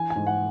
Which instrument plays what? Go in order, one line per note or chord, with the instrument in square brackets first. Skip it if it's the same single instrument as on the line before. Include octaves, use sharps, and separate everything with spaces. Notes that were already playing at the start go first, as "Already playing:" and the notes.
Already playing: [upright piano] E3 G#5
G#5
G#2
F#5